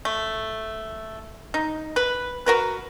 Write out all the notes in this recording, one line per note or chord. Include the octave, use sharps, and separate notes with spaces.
A3
D#4
B4
F#4 A#4 B4